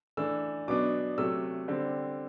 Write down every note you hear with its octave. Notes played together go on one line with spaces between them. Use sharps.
E3 A3 D4 E6
B2 F#3 B3 D4 D6
C3 F#3 A3 E6
D3 G3 C4